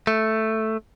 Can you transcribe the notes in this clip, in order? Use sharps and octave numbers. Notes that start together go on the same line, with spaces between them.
A3